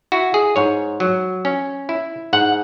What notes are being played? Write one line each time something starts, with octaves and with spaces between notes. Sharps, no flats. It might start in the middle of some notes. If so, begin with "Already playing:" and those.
E4 F#4
G#4
G#2 C#5
F#3
C#4
E4
G#2 F#5